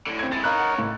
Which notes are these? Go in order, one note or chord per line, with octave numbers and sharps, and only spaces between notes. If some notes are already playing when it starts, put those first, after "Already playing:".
A2 D3
C4 G#6
G#3 E4 A6
D#4 A#4 C#5 D#5 F5 B5 F#6
F#5
A2 C#3 A#3